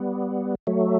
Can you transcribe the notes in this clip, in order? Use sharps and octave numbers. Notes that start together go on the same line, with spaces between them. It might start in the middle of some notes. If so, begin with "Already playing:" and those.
Already playing: G3 B3
F#3 A3